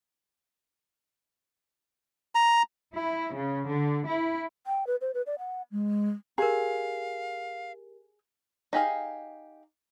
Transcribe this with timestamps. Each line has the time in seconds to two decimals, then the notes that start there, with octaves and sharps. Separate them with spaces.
2.35 A#5
2.94 E4
3.34 C#3
3.66 D3
4.06 E4
4.67 G5
4.87 B4
5.01 C5
5.14 B4
5.27 D5
5.39 F#5
5.72 G#3
6.38 G4 G#4 A#4 F5
8.73 D#4 G4 G#4 F5